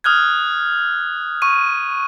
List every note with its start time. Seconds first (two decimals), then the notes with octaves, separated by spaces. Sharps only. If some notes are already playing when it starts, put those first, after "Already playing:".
0.04 D#6 F6 F#6 G#6
1.42 C#6 D#7